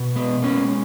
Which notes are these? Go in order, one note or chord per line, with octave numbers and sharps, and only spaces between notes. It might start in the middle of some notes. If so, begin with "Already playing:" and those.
Already playing: B2
G#3 B3
G#3 A#3 C#4